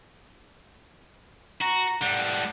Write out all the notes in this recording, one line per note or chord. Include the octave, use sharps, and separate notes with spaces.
F#4 A#5
A2 G3 F#5